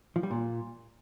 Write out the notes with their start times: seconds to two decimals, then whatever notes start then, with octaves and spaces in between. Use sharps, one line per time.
0.16 F3
0.23 G3
0.31 A#2